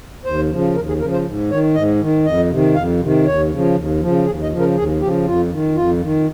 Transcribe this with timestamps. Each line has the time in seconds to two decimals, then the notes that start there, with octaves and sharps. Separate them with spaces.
0.25 D#2 C5
0.51 C#3 F3
0.75 D#2 A#4
0.88 G#4
1.00 C#3 F3 A#4
1.13 C5
1.25 G#2
1.51 D#3 C#5
1.75 G#2 D#5
2.01 D#3
2.25 F2 D#5
2.50 C3 D#3
2.75 F2 F5
3.00 C3 D#3
3.26 D#2 C#5
3.50 C#3 F3
3.75 D#2
4.01 C#3 F3
4.26 D#2 G#4
4.43 D#5
4.51 C#3 F3
4.59 A#4
4.76 D#2 G#4
5.01 C#3 F3 G4
5.25 F2 F4
5.51 D#3
5.76 F2 F4
6.02 D#3